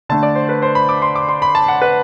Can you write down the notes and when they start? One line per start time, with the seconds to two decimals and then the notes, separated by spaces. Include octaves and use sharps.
0.09 D3 A3 D4 A5
0.23 D5
0.36 C5
0.49 B4
0.62 C5
0.75 B5
0.89 D6
1.02 C6
1.16 D6
1.28 C6
1.42 B5
1.55 A5
1.68 F#5
1.82 B4